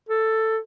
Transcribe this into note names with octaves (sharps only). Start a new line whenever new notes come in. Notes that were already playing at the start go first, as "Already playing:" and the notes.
A4